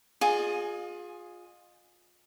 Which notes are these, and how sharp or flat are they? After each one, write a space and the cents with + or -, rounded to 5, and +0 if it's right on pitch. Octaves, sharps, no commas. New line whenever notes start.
F4 +25 G#4 +0 D#5 -25